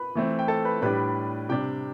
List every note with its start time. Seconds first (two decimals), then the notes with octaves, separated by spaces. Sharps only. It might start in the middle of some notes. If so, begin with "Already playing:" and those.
Already playing: B4 B5
0.15 E3 A3 C4
0.39 G5
0.48 A4 A5
0.65 B4 B5
0.82 A2 G3 D4 B4 B5
1.49 C3 G3 D4 G4 G5